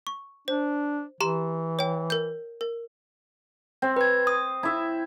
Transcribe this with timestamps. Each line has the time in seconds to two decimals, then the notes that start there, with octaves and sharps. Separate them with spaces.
0.07 C#6
0.48 D4 C5
1.20 E3 G4 A#5 C6
1.79 C#5 G5
2.10 A#4 G6
2.61 A#4
3.82 C4
3.96 B4 G#6
4.27 D#6
4.63 E4 E5